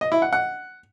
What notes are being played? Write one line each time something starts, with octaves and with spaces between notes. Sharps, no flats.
D#5
E4
F#5
F#5